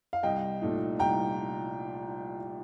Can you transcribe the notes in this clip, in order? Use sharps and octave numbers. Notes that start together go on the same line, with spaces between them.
F5
C2 D#5 G5
A#2 A3 D#4
C2 G5 A#5